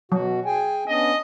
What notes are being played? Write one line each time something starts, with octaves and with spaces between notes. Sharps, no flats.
B2 F#3 F#4
G#4 G5 G#5
B3 C#4 D4 D#5